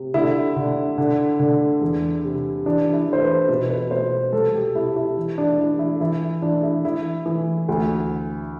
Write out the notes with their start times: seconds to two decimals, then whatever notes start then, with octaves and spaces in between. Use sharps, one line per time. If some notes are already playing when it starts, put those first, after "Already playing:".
Already playing: C3
0.14 D3 E4
0.56 D3
0.98 D3
1.40 D3
1.81 E2
2.24 C3
2.66 E3 D4
2.93 E4
3.07 E3
3.13 C5
3.22 B4
3.49 B2 B4
3.70 B4
3.91 B2 C5
4.33 C2 A4
4.54 G4
4.75 C3 E4
4.96 E4
5.17 E3
5.38 D4
5.59 E3 E4
5.79 E4
6.00 E3 E4
6.42 E3 D4
6.63 E4
6.84 E3 E4
7.26 E3
7.69 D2